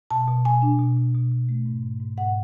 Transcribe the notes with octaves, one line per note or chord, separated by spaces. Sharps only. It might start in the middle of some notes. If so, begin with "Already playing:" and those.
B2 A5
B2
B2 G#5
D4
B2
B2
B2
B2
A3
G#2
G#2
G#2
G#2 F#5